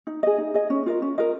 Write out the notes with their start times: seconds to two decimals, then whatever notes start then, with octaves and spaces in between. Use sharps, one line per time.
0.07 D#4
0.23 G#4 D#5
0.38 D#4
0.54 G#4 D#5
0.70 C#4
0.86 F4 A#4 D#5
1.02 C#4
1.18 F4 A#4 D#5